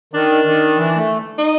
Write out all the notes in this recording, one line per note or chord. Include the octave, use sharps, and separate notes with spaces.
D#3 D4
D#3
E3
A3
D#4